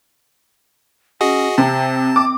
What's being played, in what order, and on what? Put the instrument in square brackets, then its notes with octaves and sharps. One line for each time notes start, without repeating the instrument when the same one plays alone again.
[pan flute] C#4 [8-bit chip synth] F#4 G#4 D#5
[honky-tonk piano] C3 [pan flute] C4 [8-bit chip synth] A5
[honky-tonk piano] D6